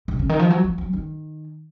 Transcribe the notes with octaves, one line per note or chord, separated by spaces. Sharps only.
C3
C#3
D#3
F3
F#3
F3
F#3
D#3